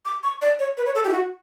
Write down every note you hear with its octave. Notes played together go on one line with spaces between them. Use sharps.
D6
C#6
D5
C#5
B4
C#5
A4
G4
E4
F#4